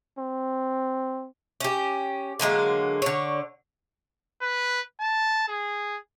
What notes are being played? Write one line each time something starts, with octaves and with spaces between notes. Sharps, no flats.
C4
C#4 G4
D3 F#3 G#3 A#3
D3 C#5
B4
A5
G#4